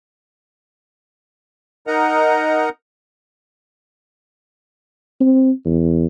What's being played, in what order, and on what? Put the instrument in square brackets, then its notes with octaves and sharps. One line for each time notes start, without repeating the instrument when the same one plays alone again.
[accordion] D#4 A#4 D#5 F#5 A#5
[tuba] C4
E2